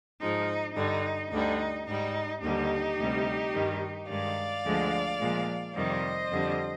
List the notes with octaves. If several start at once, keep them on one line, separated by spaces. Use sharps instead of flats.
G#2 F3 G#3 D#4
G2 D3 G3 D#4
D2 D3 G3 D#4
G#2 G3 D#4
D#2 D3 G3 D#4 G4
D2 C3 G3
G2 D#3 G3
G2 D#3 G#3 D5 F5
D2 D3 F3 G#3
A#2 F3 G#3
F2 C3 D#3 G3 C5 D#5
F2 D3 G3